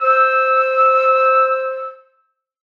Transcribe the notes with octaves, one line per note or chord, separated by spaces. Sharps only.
C5 E6